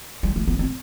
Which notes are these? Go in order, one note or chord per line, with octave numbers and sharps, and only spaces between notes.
G3
A3
B3
C4